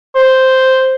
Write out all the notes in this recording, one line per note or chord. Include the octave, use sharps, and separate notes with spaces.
C5